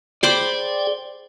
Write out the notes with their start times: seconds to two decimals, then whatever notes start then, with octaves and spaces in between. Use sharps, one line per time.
0.23 G#4 C5 D5 G5 B5 D6